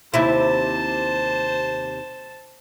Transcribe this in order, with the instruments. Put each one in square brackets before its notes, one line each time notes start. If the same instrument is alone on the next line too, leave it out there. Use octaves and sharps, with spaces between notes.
[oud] D#2 C3 E4 [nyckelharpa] C5 A5